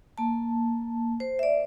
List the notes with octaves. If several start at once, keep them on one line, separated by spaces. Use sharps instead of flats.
A#3 A5
C5
D5 E5